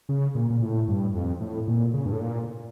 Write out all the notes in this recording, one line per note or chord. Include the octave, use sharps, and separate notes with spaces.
C#3
A#2
A#2
A2
G2
F2
A2
A#2
C#3
G2
A2
A#2